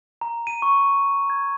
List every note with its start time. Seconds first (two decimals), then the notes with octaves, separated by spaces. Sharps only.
0.21 A#5
0.47 D#7
0.62 C#6
1.30 G#6